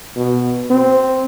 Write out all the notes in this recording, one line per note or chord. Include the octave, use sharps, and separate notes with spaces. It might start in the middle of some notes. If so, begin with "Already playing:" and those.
B2
C4